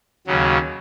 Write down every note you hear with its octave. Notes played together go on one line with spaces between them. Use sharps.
D#2 C#3 F#3